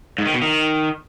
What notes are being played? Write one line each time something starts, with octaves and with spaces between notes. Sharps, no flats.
G#2
D#3
B2
D#3